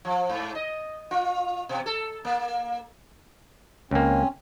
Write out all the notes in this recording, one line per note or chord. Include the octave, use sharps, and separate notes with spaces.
F3
G#2
D#5
F4
B2
A4
A#3
C#2 A#3 C4 C#4